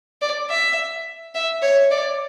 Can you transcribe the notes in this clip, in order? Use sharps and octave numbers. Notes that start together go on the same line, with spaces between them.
D5
E5
E5
C#5
D5